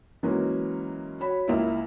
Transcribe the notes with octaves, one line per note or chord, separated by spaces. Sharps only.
E3 F#3 G#3 A#3 C#4
F#4 C#5 B5
C#2 A#3 E4